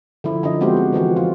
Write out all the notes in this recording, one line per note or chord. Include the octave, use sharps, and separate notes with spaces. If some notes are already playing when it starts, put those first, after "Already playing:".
D3 F3 E4
D3 F3 D4 D#5
G#3 B3 C4 F#4 G4 C5
C4
D3 E3 F3 F#4
F4